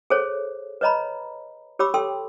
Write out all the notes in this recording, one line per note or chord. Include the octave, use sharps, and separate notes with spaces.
G#4 A4 C5 C#5
B4 C#5 D#5 A#5 B5
G4 C#5 B5 D6 E6
A4 G5 C6 E6